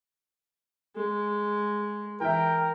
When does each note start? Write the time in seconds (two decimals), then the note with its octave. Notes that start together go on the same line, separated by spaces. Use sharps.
0.96 G#3
2.21 E3 A#4 E5 G5